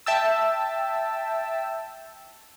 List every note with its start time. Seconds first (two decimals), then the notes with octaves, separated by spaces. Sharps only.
0.06 E5 G5 A5 E6